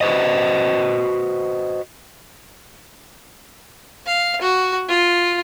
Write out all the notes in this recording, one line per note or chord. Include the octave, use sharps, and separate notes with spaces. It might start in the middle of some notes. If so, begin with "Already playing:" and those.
F#4 B4 C5 D#5
F5
F#4
F4